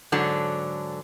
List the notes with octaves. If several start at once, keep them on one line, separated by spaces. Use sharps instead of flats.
G#2 D3 F#3 D4 A4